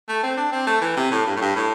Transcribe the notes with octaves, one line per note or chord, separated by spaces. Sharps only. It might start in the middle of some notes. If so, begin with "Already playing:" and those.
A3
C4
D4
C4
A3
E3
C3
A2
G2
A2
G2
A2